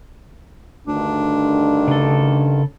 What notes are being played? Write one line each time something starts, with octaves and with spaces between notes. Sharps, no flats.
D2 G2 D3 D#3 D4
C#3 A4